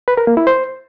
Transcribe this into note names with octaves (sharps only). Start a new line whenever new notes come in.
B4
A#4
A#3
E4
C5